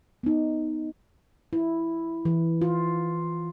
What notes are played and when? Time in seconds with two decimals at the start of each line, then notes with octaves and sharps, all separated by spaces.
0.23 B3 D#4
1.53 E4
2.25 E3
2.62 F4